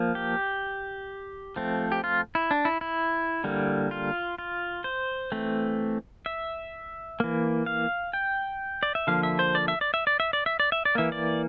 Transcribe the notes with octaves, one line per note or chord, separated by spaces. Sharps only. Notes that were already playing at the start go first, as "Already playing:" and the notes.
Already playing: F3 A#3
G4
F3 A3 C4
G4
F4
E4
D4
E4
E4
D3 G3 A#3
F4
F4
C5
E3 A3 C4
E5
E3 A#3
F5
G5
D5
E5
D3 F3 A#3 F5
E5
C5
D5
E5
D5
E5
D5
E5
D5
E5
D5
E5
D5
E3 A#3 E5
D5